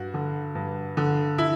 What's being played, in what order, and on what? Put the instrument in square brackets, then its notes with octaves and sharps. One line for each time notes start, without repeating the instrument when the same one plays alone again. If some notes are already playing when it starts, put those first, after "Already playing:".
Already playing: [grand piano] G2 F#4
D3
G2
D3
E4